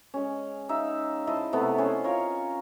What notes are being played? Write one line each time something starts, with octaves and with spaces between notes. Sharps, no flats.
G#3 C#4
D#4 E5 F5
E4 C5 D#5 A5
C3 A3 B3
C#4 G#4 C5
F4 A#4 C#5